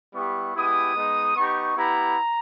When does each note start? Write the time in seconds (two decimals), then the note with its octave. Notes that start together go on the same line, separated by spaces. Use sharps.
0.14 G3 B3 E4 G4 C#6
0.54 G#3 B3 E4 G4 D#6
0.95 G#3 B3 D#4
1.36 B3 D#4 G4 C#6
1.77 B3 E4 G4 A#5